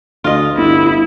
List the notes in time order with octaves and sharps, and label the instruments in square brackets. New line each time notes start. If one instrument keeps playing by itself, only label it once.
[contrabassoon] D2 [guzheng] F4 D#5
[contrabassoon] G1 [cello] E4